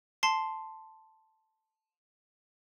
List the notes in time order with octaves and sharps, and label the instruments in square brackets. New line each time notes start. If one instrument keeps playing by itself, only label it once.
[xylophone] A5 C6 C7